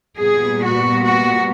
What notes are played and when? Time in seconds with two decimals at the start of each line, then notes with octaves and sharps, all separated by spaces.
0.18 A#2 G3 B3 G#4
0.63 F#4
1.06 F#4